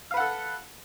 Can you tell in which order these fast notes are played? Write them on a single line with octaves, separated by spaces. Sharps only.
F5 B4 F#5 A4